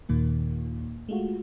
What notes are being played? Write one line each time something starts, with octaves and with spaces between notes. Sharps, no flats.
D#2 A#2 D#3 A#3
G#3 A3 F4 F#4